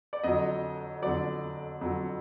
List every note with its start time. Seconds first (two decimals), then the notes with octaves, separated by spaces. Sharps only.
0.13 D5
0.23 F2 D3 F#3 D#5
1.02 F2 D3 F#3 D5
1.81 F2 D3 F#3